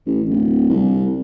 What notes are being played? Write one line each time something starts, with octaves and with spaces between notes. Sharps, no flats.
A1
D1
C2